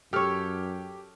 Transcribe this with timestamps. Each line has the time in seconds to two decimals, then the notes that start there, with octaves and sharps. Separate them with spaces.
0.13 F#2 G4 A4 C#5 F6